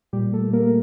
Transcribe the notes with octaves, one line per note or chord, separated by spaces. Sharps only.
A#2 G3 G4
A3 A4
A#2
A#3 A#4